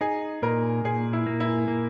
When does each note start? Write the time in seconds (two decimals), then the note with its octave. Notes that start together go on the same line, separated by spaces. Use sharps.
0.01 D#4 G#4
0.42 A#2 A#4
0.85 A#2 G#4
1.13 E4
1.26 A#3
1.40 E4
1.68 A#3